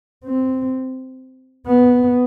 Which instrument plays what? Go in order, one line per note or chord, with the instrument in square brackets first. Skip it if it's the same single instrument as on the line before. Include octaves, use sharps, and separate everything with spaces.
[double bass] C4
B3